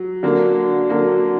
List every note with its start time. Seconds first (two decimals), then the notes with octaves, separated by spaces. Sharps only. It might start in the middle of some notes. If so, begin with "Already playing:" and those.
Already playing: F#3
0.23 D3 F#3 A#3
0.89 D3 F#3 A#3